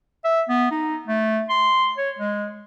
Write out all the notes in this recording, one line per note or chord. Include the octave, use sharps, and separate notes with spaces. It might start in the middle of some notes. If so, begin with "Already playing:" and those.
E5
B3
D#4
A3
C6
C#5
G#3